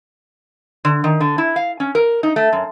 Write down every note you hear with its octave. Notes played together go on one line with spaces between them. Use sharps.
D3
D#3
D3
E4
F5
C#4
A#4
D#4
A3
F#2